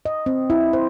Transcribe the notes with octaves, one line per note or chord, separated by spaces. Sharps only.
D#5
C4
E4
C5